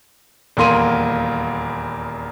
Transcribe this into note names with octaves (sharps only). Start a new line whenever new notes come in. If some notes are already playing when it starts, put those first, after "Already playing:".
D#1 E2 A#3 C6 D#7